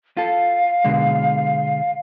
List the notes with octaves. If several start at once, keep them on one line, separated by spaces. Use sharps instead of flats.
F4 A4 F5
B2 D3 G#3